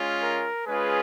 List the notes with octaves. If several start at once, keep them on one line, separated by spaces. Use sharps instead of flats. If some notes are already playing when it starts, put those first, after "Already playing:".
Already playing: G#3 C#4 F4
A#4
G#3 C#4 F4 G#4 B4